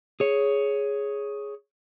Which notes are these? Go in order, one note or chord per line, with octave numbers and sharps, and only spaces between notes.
G#4 C#5